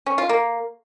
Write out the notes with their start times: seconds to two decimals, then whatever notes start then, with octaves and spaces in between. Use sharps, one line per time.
0.06 C#4
0.18 F4
0.29 A#3